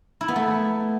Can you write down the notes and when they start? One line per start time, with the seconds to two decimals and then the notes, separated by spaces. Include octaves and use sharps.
0.21 E4
0.28 B3
0.36 A3